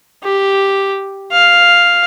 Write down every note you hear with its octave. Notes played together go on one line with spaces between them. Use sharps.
G4
F5